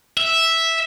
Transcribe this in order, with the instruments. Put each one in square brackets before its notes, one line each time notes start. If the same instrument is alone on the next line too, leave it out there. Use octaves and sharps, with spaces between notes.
[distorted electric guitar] E5